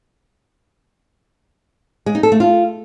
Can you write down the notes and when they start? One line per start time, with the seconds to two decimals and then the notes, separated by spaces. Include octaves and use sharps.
2.06 G#3
2.15 D#4
2.23 A4
2.32 A3
2.40 F4